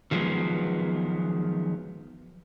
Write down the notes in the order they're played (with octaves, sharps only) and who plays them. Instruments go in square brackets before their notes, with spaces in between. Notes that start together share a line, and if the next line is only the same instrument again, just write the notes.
[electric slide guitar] D#3 F3 F#3 G#3 B3